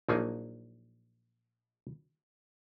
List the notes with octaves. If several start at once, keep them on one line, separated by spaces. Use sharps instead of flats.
A#1 F3 F#3 A#3 D#4 G#5